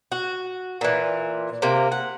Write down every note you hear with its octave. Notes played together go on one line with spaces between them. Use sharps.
F#4
A#2 E3
C3 A#3
F#5